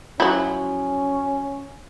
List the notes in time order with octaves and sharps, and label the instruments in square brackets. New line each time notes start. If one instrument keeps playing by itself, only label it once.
[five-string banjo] F3 F#3 B5 [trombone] C#4 [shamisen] E4 F#4